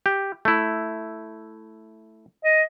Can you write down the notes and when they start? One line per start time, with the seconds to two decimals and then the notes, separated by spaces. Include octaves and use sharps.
0.06 G4
0.45 A3 E4
2.44 D#5